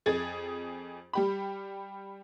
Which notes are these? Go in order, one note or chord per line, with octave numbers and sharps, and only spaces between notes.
F2 G#4 G#6 A6
G3 G4 B5